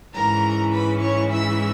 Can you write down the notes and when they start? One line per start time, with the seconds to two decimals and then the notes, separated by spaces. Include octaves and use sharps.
0.14 G#2 E3 G#3 C#4 E4 A#4 A#5
0.72 B4 B5
1.01 C#5 C#6
1.31 E5 E6